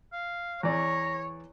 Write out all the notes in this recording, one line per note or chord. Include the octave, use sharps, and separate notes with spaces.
F5
E2 E3 C#5 D5 A#5